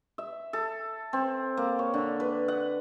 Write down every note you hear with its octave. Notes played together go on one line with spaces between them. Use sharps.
E5
A4
C4
A#3
C#5
D3
B4
F#5